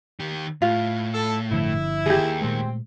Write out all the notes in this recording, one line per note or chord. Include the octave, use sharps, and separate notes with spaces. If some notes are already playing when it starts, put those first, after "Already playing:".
D#3 G4
A2 F4
A4
G1 D3 F3 E4
D#2 G4 G#4
A#2 G#3 A3 C4